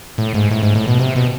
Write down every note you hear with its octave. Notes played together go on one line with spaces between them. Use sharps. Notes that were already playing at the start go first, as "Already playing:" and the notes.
A2
G#2
A2
G#2
A2
B2
C3
B2